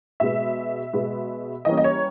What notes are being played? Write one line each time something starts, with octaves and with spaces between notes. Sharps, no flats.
B2 G#3 B3 E5
B2 G#3 B3
E3 G3 A#3 C#4 D#5
D#5
C#5